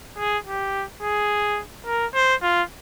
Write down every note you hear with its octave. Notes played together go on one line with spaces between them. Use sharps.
G#4
G4
G#4
A#4
C5
F4